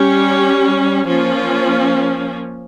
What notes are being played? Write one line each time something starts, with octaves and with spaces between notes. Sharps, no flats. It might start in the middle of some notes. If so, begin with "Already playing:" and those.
Already playing: G3 C#4 G4
F3 A#3 C#4 F4